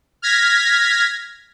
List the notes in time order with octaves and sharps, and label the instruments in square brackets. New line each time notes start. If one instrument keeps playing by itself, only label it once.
[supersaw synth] F6 G#6 A#6 B6